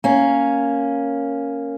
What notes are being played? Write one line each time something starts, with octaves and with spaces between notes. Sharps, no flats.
A#3 C#4